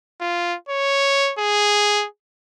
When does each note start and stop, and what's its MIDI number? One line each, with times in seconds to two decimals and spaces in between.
0.20 0.55 65
0.69 1.33 73
1.38 2.06 68